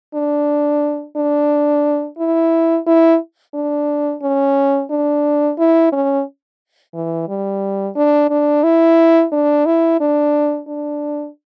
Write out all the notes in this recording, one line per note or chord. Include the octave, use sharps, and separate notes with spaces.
D4
D4
E4
E4
D4
C#4
D4
E4
C#4
E3
G3
D4
D4
E4
D4
E4
D4
D4